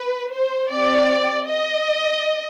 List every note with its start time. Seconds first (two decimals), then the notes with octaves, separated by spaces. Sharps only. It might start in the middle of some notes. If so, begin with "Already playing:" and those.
Already playing: B4
0.33 C5
0.71 C4 G4 D5
1.48 D#5